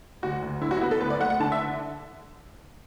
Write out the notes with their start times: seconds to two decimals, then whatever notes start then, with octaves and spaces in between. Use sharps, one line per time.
0.23 D2 F#4
0.42 D2
0.61 D3 E4
0.71 F#4
0.77 E4
0.81 B3 F#4
0.91 A4
1.01 D2 B4
1.10 D5
1.20 A3 F#5
1.30 F#5
1.40 D3 A5
1.52 E5